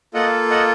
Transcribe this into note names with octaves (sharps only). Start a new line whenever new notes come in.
A#3 F4 A4 D#5 F#5
D#5 F#5